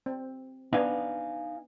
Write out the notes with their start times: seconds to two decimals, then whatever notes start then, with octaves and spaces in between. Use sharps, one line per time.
0.06 C4
0.73 B3 D4 D#4 F5 G#5